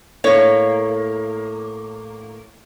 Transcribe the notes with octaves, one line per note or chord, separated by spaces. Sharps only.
A2 A#3 C#5